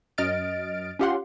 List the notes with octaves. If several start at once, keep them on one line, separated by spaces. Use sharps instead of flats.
F#2 D#5 F6 A6 D7
C#4 F4 G4 F5 F#5 C6